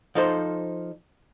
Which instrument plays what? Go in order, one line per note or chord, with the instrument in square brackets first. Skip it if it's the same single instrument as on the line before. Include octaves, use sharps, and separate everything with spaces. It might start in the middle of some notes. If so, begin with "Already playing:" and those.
[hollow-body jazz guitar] F3 D#4 A4 C5